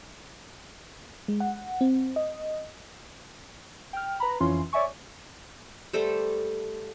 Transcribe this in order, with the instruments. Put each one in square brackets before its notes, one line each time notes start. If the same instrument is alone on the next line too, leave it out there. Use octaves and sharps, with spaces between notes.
[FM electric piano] G#3
F#5
C4
D#5
[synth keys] G5 F6
B4 A#5 B5
F2 E3 C#4 F4 C6
C#5 D5 E5 G#5 C#6
[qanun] G3 A3 A4 C5